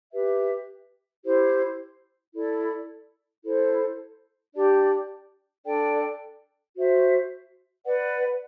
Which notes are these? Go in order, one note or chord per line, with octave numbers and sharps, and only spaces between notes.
G4 B4 E5
E4 G4 C5
E4 A4 D5
E4 A4 C5
D4 G4 D5
D4 A4 D5 G5
F#4 C5 E5
B4 D5 F#5